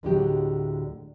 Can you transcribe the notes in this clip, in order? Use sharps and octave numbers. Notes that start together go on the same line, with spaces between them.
D2 A2 D3 F#3 G#3 G4